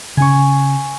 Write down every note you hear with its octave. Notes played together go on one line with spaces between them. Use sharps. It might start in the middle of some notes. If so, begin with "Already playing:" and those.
C#3 C#4 G#5 C#6